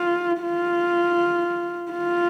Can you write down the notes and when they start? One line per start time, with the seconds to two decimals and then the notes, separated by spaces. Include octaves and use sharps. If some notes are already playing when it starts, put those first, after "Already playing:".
Already playing: F4
0.42 F4
1.92 F4